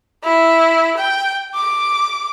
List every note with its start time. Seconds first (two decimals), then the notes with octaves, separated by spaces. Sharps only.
0.24 E4
0.98 G5
1.55 D6